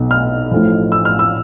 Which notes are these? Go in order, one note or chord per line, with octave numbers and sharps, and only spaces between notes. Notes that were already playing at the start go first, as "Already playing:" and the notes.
Already playing: B1 B2
F6
A1 A2 F3
E6
F6
E6